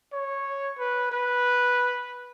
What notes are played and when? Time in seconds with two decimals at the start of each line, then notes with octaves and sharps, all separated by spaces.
0.13 C#5
0.79 B4
1.12 B4